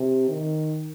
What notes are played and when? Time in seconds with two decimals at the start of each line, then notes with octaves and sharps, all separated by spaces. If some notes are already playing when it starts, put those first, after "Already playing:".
Already playing: C3
0.29 D#3